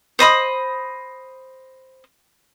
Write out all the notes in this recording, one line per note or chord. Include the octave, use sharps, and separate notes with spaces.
C5 D#5 B5 D#6